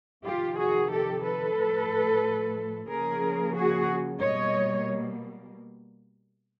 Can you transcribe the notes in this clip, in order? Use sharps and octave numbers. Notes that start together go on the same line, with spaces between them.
F2 C3 D#3 F4 G4
F#4 G#4
G4 A4
A4 B4
A2 F3 A3
C#3 F3 A#3 C#4 G#4 A#4
F#4 G#4
B2 G3 A#3 C#5 D#5